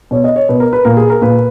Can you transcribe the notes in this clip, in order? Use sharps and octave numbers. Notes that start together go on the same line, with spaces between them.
B2 C#5
D#5
C#5
B2 B4
A#4
B4
A#2 A#4
G#4
A#4
A#2 B4